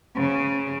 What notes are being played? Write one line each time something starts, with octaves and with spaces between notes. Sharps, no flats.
C#3